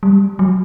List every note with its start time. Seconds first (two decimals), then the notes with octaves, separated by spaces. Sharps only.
0.03 G3
0.39 F#3